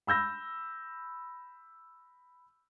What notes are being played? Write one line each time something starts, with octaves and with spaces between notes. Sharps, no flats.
B5 E6 G6 A#6